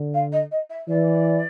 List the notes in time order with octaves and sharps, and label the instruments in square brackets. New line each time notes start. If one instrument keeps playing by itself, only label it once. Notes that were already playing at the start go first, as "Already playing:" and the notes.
Already playing: [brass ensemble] D3
[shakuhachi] F5
D#5
D#5
E5
[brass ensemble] E3 [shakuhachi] D5